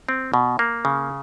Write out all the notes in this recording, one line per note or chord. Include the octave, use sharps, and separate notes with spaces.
C4
B2
A#3
C#3